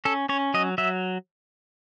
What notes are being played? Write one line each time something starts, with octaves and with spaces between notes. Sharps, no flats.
C#4 A4
C#4 C#5
F#3 D#5
F#3 E5